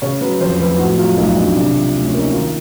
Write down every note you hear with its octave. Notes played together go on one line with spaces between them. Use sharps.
C#3 C#5
F#3 B4
F2 C5
F2 B4
A2 F#4
F#3 F4
B1 D#4
B1 D4
C3 D4
F3
D2
C#4
A#3
D#4
D#3 F4